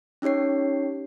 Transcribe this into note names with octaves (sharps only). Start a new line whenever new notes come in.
C#4 D#4 G4 C#5 C7